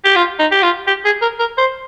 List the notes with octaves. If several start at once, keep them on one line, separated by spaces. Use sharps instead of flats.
G4
F4
D#4
G4
F4
G4
G#4
A#4
A#4
C5